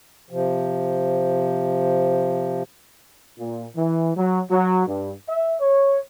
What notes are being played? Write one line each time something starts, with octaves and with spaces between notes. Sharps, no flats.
C3 F3
A#2
E3
F#3
F#3
G2
E5
C#5